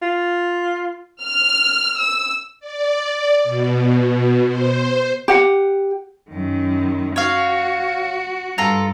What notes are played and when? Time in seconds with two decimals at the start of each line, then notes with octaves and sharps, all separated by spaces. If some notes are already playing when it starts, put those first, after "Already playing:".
0.02 F4
1.23 F6
1.98 E6
2.60 D5
3.44 B2
4.46 C5
5.28 G4 F#5
6.31 F#2 D#3
7.16 F#4 C#5 F5
8.58 G2 F4 A4 A#5